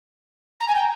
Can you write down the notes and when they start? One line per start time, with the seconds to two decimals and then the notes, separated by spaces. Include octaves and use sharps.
0.60 A#5
0.68 G#5
0.75 G5